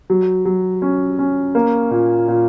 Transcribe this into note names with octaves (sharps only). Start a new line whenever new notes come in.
F#3
F#3
C#4
C#4
A#3
A#2
A#2